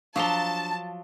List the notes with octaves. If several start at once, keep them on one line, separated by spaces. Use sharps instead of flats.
F3 F#3 D4 F5 A5 A#5 G7